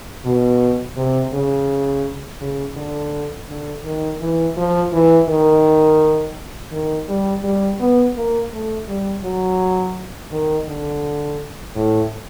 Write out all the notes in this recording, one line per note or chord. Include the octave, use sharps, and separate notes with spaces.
B2
C3
C#3
C#3
D3
D3
D#3
E3
F3
E3
D#3
D#3
G3
G3
B3
A#3
A3
G3
F#3
D#3
D3
A2